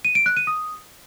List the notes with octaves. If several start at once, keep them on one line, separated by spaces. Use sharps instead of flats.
D#7
D7
F#6
D#7
D#6